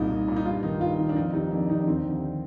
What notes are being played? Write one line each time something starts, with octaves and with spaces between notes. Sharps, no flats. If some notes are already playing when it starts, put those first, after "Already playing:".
Already playing: C2 A#2 D#4
C2
A#2
D#4
G2 F4
D#3 D#4
G2 F4
D#3
D4
F2 D#4
C3 D#3 D#4
F2 D4
C3 D#3 D#4
D4
D#2 C4
D3